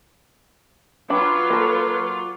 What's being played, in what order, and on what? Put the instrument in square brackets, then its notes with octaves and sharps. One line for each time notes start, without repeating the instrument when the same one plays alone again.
[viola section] F#3 F4 [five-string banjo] D4 B5 [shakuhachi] B4 [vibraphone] D6
[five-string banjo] A#3 A4